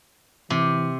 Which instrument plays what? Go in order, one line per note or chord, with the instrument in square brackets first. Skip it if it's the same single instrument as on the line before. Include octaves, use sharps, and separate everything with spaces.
[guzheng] C3 [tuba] E3